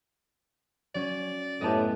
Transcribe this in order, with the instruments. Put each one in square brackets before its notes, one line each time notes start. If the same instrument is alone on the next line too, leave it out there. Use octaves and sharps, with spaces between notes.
[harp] F#3 C#4 [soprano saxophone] D5
[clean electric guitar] F#2 B3 A5 [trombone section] A2 [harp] G4 D#5